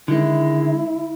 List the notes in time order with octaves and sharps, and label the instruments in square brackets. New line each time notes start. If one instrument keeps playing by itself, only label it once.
[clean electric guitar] D3 D#3 G#3 [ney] E4